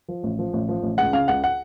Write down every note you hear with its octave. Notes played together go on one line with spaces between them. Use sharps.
F3
A1
F3
A1
F3
A1
C#2 F#5
C#3 F5
C#2 F#5
F#5